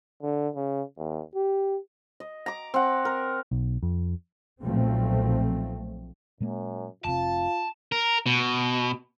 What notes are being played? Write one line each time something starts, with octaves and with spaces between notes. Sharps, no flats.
D3
C#3
D#2
G4
D#5
A#5 D6
C4 F#5
A#4
B1
F2
B1 A#2 F3 A3 C4
F#2 A#2 G#3 A#3
F1 C3 F4 A5
A#4
B2